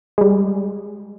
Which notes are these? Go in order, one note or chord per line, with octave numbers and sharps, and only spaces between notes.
G3 G#3